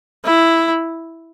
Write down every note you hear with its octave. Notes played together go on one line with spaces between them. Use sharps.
E4